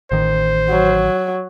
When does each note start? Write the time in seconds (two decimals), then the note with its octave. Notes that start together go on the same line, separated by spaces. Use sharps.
0.12 A1 D#3 C5
0.70 F#3